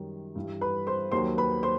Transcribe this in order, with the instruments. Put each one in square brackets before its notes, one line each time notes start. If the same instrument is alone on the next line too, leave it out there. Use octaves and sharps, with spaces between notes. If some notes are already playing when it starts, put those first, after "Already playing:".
Already playing: [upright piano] F#2 D#3 G3
G2 E3 G3
B4 B5
C5 C6
D#2 D#3 F#3 C5 C6
B4 B5
C5 C6